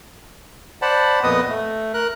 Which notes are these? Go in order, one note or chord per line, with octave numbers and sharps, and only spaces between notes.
C5 D5 F#5 A5 B5
F2 A#2 B3 B4 D#5 D#6
A3
A#4 F#6